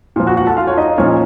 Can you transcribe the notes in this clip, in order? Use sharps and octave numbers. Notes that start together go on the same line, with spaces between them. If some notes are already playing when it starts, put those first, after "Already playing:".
A#2 F3
F#4 F#5
F#4 F#5
A4 A5
F4 F5
C#5
D#4 D#5
A#2 F3 C#4 C#5